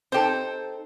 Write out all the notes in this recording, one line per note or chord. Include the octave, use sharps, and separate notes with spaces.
C4 D#4 G4 A4 C5